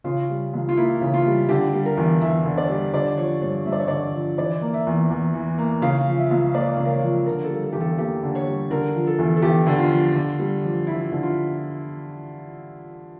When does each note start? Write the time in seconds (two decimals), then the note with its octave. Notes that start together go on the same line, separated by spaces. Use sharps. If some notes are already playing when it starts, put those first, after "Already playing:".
0.04 C#3 F4
0.29 G3
0.54 C#2
0.69 F4
0.77 A#3 E4
1.01 C#3
1.13 F4
1.26 G3
1.49 D3 G4
1.73 G3
1.85 A#4
1.97 E2
2.21 E2 E5
2.45 D3
2.57 D5
2.69 G3
2.94 D3 D5
3.17 F3 C#5
3.41 G2 C#5
3.66 G2 E5
3.72 D5
3.80 C#5
3.88 D3 D5
4.14 F3
4.38 E3 D5
4.62 A#3
4.74 E5
4.87 E2
5.10 E2
5.34 E3
5.58 A#3
5.82 C#3 F5
6.07 F3
6.18 E5
6.31 C#2
6.54 A#3 D5
6.78 C#3
6.85 A#4
6.90 C#5
7.02 F3
7.26 D3 A#4
7.44 A4
7.50 G3
7.63 A4
7.73 E2 G4
7.81 A4
7.98 A#3 G4
8.23 D3
8.35 C#5
8.47 G3
8.71 D3 A#4
8.95 F3
9.07 A4
9.18 E2
9.37 A4
9.42 E2 G4
9.67 D3
9.78 F4
9.91 F3
10.15 D3
10.39 G3
10.63 F2
10.87 F2 E4
11.12 D3
11.23 F4